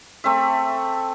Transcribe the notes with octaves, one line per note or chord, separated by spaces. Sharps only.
A3 C4 E5